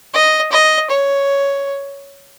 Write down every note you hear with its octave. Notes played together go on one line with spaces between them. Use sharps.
D#5
D#5
C#5